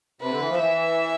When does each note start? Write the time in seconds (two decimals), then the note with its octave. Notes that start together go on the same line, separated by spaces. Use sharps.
0.21 C3 B4
0.30 D3
0.40 E3
0.49 F3
0.58 E3 E5